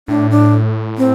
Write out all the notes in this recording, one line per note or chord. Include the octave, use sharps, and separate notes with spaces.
A2 D4
D4
C4